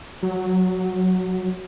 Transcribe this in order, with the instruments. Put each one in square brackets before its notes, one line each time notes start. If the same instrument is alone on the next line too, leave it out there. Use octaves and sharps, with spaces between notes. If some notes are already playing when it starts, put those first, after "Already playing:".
[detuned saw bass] F#3